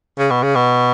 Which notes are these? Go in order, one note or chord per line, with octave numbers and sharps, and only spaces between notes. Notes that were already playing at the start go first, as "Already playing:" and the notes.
C#3
B2
C#3
B2